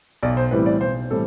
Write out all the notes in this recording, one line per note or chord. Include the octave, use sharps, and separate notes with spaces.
B1 D5
C5
A2 E3 G3 C4 B4
D5
B1 C5
A2 E3 G3 C4 A4